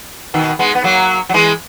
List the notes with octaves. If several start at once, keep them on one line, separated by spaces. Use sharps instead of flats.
B2 D#3
G#3 B3
B3
F#3 A#3
F#3
E3 G#3